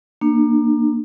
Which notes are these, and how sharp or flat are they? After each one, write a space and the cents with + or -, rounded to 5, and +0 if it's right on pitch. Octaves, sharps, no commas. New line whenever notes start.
A#3 +0 D4 +30